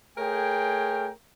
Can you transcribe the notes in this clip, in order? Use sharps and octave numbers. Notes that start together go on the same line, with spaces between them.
A3 G#4 A#4 C#5 G5